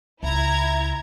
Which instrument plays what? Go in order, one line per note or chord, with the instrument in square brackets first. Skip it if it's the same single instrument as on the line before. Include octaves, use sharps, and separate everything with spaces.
[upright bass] C#2 [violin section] E4 A#5 G#6